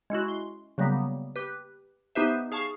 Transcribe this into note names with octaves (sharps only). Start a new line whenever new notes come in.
G#3 C#4 E4 F#4
C6
C#3 F#3 G3 A#3 B3
G4 B4
B3 D#4 G4 B4 C5 E5
G#4 F5 A5 C#6